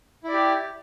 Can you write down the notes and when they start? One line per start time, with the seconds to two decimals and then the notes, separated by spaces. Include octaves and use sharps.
0.24 E4
0.28 D5
0.33 G4